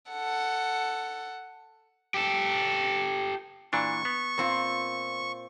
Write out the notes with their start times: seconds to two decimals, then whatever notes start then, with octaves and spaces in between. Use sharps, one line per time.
0.11 A4 F#5
2.14 G4 A4
3.73 A#2 E3 D4 C#6
4.05 B3
4.38 A#2 C4 F4